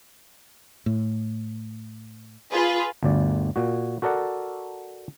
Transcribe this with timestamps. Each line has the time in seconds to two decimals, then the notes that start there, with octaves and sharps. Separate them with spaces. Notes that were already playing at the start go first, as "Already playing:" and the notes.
0.86 A2
2.53 F4 G#4 B4
3.03 G1 D2 D5
3.56 A#2 F#4
4.02 F#4 A4 A#4 D5 F#5